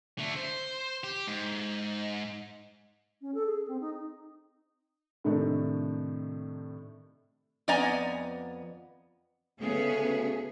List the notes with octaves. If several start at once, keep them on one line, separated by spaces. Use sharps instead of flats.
D3 A3
C5
G4
G#2
C#4
A4
G#4
C4
D#4
A2 C3 D#3 A3 D4 D#4
F2 B3 D5 D#5 G#5 A#5
D2 C#3 A3 B3 C#4 G#4